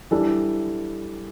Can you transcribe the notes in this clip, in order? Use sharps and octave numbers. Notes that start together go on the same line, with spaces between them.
E3 G3 D4 A4